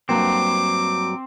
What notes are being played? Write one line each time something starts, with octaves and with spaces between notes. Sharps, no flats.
G2 F#3 A#3 C4 D6